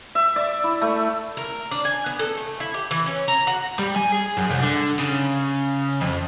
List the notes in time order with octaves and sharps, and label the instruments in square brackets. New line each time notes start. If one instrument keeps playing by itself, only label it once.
[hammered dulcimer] E5
D5
E4
A3
[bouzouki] A#4
D4
G#5
B3
A4
A3
E4
G4
E3
C#4
A#5
F#4
[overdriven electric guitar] G3
G#5
G#4
F#2
C2
D3
C#3
F2